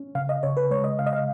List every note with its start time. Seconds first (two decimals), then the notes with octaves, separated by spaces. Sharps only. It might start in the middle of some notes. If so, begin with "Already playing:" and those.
Already playing: C#4
0.15 C#3 F5
0.29 D#5
0.43 C#3 C#5
0.57 B4
0.70 G#3 C#5
0.84 D#5
0.99 C#3 F5
1.06 D#5
1.13 F5